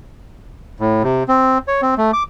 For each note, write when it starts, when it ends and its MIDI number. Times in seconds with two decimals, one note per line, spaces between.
0.80 1.03 45
1.03 1.23 48
1.28 1.58 60
1.68 1.81 73
1.82 1.94 60
1.98 2.11 57
2.13 2.23 86